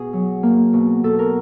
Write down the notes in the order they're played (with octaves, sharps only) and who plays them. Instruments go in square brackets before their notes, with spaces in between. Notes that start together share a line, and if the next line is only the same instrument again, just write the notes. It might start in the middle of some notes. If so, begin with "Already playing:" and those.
Already playing: [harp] B2 G#4
F#3
A#3
B2
B2 A4
A#4